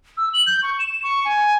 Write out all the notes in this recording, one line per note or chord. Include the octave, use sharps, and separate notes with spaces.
E6
F#7
G6
C#6
E7
C#6
G#5